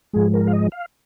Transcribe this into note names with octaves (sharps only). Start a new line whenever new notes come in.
G#2 F3 G#3 G#4
A#4
F5
D#5
F5